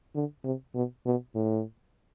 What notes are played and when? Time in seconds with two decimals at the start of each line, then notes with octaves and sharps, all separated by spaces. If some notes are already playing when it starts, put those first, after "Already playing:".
0.15 D3
0.44 C3
0.74 B2
1.05 B2
1.35 A2